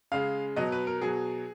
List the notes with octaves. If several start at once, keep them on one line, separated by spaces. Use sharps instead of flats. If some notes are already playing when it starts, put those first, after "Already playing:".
C#3 G#3 F5
B2 F#3 D#5
B4
A#4
B2 F#3 G#4